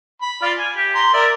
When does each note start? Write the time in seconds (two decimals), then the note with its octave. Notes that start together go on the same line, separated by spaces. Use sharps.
0.22 B5
0.42 F4 D5 F5
0.59 G#5
0.75 G4
0.95 A#5 C6
1.14 A#4 D5 E5